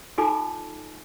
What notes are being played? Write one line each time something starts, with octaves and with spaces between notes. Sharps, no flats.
D#4 F4 A4 G#5 B5 D6